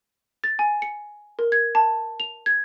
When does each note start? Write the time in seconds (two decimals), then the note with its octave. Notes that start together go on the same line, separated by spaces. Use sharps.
0.44 A6
0.59 G#5
0.82 C#7
1.39 A#4
1.52 G#6
1.75 A5
2.20 F7
2.46 G#6